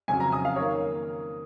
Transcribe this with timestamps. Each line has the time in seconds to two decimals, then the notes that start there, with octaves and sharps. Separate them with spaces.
0.08 F2 C#3 F#3 G#5
0.20 A#5
0.32 D#6
0.45 F5
0.56 D#3 A#3 C#5